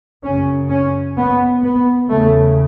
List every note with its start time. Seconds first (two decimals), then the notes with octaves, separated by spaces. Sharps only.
0.24 F#2 C#3 C#4
0.70 C#4
1.17 B3
1.64 B3
2.10 E2 C#3 A3